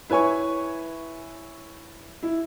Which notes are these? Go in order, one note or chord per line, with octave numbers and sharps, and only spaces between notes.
E4 B4 C#5 G#5 C#6
E4